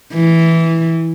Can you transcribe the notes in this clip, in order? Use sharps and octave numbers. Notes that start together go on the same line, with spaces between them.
E3